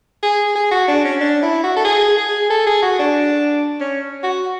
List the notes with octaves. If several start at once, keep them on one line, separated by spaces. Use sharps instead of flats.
G#4
G#4
F#4
D4
C#4
D4
E4
F#4
A4
G#4
G#4
A4
G#4
F#4
D4
C#4
F#4